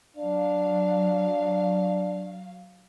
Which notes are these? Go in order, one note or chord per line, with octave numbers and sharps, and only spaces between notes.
F#3 D4 F5